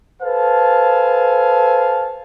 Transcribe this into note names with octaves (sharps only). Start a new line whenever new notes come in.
A4 B4 C5 F5 G#5 A5